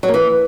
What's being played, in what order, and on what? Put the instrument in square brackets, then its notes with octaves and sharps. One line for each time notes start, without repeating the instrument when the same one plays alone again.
[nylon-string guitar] F#3
A#3
E3